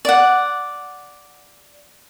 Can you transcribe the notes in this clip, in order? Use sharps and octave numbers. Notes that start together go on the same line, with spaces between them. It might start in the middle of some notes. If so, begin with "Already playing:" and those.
D5 F#5